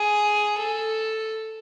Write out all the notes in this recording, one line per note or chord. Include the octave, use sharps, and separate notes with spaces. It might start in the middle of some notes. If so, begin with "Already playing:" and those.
Already playing: G#4
A4